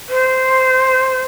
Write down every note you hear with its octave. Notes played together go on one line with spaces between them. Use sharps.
C5